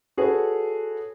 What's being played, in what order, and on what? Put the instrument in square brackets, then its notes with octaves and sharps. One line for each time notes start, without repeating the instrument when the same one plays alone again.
[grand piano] F#4 G#4 A4 B4 C#5